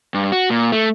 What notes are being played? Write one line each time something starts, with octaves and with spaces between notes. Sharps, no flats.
G2
F#4
A#2
A3